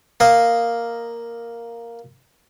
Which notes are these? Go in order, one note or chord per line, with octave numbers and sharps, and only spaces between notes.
A#3 D#5 F5